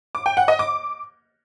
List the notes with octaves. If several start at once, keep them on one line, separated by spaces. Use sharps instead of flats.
D6
G5
F#5
D#5
D6